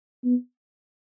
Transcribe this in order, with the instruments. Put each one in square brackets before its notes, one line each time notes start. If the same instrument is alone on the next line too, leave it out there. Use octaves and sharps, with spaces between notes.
[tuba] B3